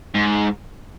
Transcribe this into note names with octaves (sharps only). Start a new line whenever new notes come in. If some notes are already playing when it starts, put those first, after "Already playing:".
G#2